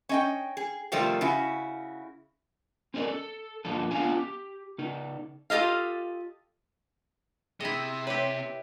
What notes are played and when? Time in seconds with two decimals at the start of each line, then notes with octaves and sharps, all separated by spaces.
0.09 C#4 D#5 G5
0.57 G#4
0.92 C3 D#3 F3 G3 A3 C4
1.21 C#3 E4 F#4
2.94 C4 C#4 D#4 G#4 A#4 D5
3.08 A4
3.65 G2 A#2 D3 F3 A4
3.91 B3 C#4 D4 F4 F5 G#5
4.17 G4
4.78 C#3 D#4
5.50 F4 G4 A4 D#5 F5
7.60 C3 E4 G#4 D#5
8.07 G4 B4 C#5 E5